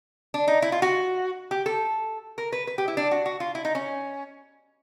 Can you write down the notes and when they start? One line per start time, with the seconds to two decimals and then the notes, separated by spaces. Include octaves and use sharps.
0.34 D4
0.48 D#4
0.62 E4
0.72 F4
0.82 F#4
1.51 G4
1.66 A4
2.38 A#4
2.52 B4
2.67 B4
2.78 G4
2.88 E4
2.97 D4
3.11 F#4
3.26 F#4
3.40 F4
3.55 E4
3.65 D#4
3.75 C#4